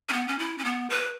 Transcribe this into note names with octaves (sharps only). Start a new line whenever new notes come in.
C#4
B3
C#4
E4
C#4
B3
B4